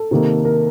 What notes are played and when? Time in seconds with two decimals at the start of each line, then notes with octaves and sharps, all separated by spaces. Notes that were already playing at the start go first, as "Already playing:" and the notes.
Already playing: A4
0.11 C3 D#3 A#3
0.45 A#4